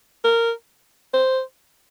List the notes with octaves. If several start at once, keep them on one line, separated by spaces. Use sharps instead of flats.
A#4
C5